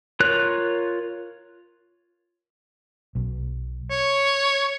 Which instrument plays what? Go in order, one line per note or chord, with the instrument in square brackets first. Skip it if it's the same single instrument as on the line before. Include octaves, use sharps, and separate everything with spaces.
[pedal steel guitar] F4 A#4 C#5 F#6
[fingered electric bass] B1
[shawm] C#5